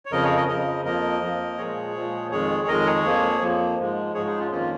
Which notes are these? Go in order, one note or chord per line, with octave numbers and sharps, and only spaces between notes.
C#5
F2 C#3 F3 A#4 D#5
G#4 C#5
A#4 D#5
F2 C#3 F3 A#4 D#5
F2 F3 A#3 A#4 D#5
F2 F3 A#3
A#2 F3 G#3 G#4 C#5
A#2 F3 G#3
F2 D#3 G#3 G#4 C#5
F2 D#3 G#3 A#4 D#5
G#4 C#5
F2 F3 A#3
F2 F3 A#3
G#2 F3 G#3
G#2 F3 G#3 G#4 C#5
D#4 G#4
C#4 F4
F2 D#3 A#3 C#4 F4